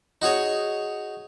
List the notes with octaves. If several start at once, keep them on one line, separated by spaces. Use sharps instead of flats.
D#4 F#4 G#4 C#5